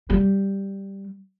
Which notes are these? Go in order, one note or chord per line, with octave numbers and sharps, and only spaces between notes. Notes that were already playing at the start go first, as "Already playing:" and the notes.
G3